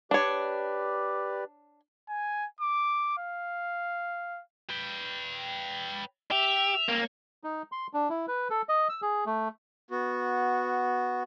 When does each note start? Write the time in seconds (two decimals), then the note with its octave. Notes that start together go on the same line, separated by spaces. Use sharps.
0.11 D4 G4 B4 C#5 D5
2.09 G#5
2.61 D6
3.18 F5
4.70 B4 G5
6.31 G4 E5 F7
6.88 A#3 C4 C#4
7.44 D#4
7.72 C6
7.94 D4
8.10 E4
8.28 B4
8.50 A4
8.69 D#5
8.89 E6
9.02 G#4
9.26 A3
9.91 B3 F#4